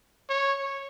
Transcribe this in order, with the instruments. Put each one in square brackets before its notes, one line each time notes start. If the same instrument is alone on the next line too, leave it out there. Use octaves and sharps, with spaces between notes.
[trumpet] C#5